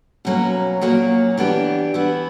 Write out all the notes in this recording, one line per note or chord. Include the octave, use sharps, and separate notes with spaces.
B2 F#3 A#3 C#4
A#2 F#3 A#3 C#4
E3 B3 D4 G4
E3 B3 E4